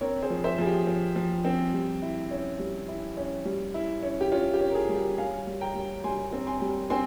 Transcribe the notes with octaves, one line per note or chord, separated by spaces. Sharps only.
C4 A#4 C#5
G#4 C5
F3
C5 E5
F3 G#4
G4
F3
F3
C4
G3
E4
C#4
G3
E4
C#4
G3
E4
C#4
G4
C#4 F4
G4
C#4
A#4
F4 G#4
G3
G4 A#4
G3 F5 G#5
G3
G5 A#5
G3
G3 G#5 C6
C4
G#5 C6
G3
C4 G#5 C6